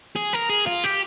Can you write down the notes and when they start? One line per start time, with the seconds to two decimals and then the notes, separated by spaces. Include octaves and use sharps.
0.16 G#4
0.33 A#4
0.50 G#4
0.66 F4
0.84 G4